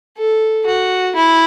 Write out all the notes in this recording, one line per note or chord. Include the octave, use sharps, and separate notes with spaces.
A4
F#4
E4